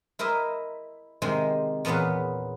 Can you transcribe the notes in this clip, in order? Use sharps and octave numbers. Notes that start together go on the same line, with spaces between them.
E4 A#4 C5 D#5 E5
C3 D#3 G#3 C5 G#5
E2 A#2 B3 C#4 B4 F5